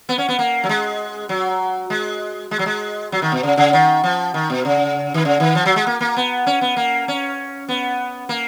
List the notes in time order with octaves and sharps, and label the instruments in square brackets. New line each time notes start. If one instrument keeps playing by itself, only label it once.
[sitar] B3
C#4
B3
A#3
F#3
G#3
F#3
G#3
G#3
F#3
G#3
F#3
D#3
B2
C#3
C#3
D#3
F3
D#3
B2
C#3
D#3
C#3
D#3
F3
F#3
G#3
A#3
A#3
B3
C#4
B3
A#3
C#4
B3
A#3